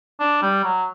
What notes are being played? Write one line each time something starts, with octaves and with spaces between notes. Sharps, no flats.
D4
G3
F#3